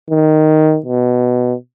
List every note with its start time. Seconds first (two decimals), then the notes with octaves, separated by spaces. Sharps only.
0.10 D#3
0.86 B2